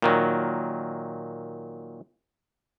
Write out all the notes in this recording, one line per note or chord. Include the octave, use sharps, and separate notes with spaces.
A#2 D#3 F#3